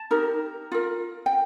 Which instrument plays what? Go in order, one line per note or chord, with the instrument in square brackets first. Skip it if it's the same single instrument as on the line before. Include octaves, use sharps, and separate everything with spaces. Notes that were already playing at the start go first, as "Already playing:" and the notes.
Already playing: [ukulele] A5
D#4 G4 A#4
F4 A#4
G5